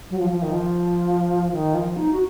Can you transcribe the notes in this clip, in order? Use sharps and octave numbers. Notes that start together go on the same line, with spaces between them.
F#3
F3
F3
D#3
F3
D#3
F3
D#4
F#4